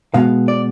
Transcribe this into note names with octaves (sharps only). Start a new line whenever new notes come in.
B2 G#3 B3 F5
D5